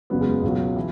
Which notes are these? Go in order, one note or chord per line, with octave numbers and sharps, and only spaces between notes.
F#1 E2 C#3 F#3 B3
G#3
C#2 B2 F#3
E3